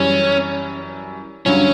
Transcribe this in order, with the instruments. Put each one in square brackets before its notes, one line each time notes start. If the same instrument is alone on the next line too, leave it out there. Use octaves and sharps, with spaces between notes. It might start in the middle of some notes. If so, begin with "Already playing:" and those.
Already playing: [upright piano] F#2 E3 G3 [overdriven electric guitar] C#4
[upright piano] G2 D3 F#3 [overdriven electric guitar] C#4